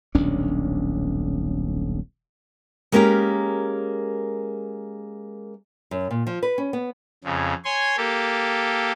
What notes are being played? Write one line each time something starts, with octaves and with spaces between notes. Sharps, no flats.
D#1 B1 C#4 D4
G#3 A#3 C#4 G4 G#4 A#4
F#2
A#2
F3
B4
C#4
B3
F2 C#3
C#5 G#5 C6
A#3 G4 A4